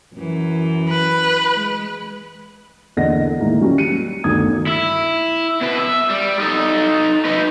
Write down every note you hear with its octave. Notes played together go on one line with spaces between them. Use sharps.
F#2 E3
B4
G#3
E2 D3 A#3 D#5 F#5 A#6
A2 D#3 G#3 A#3 E4
F#3 G3 C#4
C#7 D#7
G1 D2 D#3 D#6 G#6
E4
B2 B4
E5
G3
D#4 A4
D#4 B4